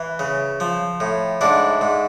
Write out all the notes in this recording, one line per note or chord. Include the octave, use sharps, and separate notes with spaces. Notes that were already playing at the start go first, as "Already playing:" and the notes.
Already playing: E3
C#3
F3
A2
G#2 D4 E4
G#2